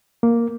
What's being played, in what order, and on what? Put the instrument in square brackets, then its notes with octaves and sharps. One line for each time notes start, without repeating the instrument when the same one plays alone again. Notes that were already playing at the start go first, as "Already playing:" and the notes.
[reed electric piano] A#3